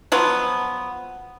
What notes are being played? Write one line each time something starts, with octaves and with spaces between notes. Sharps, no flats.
F3 F#3 B3